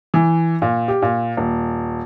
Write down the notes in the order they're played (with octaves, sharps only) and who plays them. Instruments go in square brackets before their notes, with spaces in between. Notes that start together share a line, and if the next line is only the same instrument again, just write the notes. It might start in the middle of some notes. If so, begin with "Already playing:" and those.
[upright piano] E3
A#2
G4
A#2
D#1